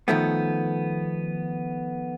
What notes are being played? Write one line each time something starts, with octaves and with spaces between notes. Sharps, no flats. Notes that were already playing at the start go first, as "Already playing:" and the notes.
D#3 F3 A3 B3